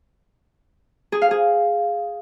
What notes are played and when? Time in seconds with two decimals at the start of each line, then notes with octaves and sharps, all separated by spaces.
1.12 G#4
1.22 F5
1.31 G#4